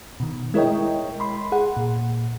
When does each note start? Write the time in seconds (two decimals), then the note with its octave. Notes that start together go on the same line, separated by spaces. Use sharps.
0.20 B2 D#3
0.54 G#3 E4 A#4 C#5 D#5 G5
1.20 B5 C6
1.52 G#4 F#5
1.77 A#2